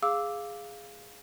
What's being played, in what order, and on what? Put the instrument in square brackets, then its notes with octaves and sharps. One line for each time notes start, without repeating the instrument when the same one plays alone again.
[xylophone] G#4 F5 D6 E6